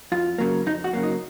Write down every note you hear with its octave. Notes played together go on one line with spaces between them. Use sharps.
F2 F4
C#3 F#3 A#3
F2 D#4
F#4
C#3 F#3 A#3
D#4